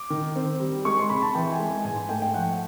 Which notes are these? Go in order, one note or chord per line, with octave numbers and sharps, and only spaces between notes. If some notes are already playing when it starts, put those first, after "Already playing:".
Already playing: D6
D#3
C4
G3
G#3 C#6
C6
C3 B5
A5
E3 G5
G#5
G#3
G#5
G#2 G#5
G#5
A3 G5
G5
F3 F#5